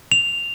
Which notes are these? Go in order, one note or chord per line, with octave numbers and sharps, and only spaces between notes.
F7